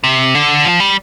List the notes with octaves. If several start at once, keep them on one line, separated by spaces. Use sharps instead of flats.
C3
D3
F3
G3